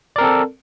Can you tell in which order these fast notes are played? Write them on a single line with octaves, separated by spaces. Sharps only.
D5 A#4 C4 A4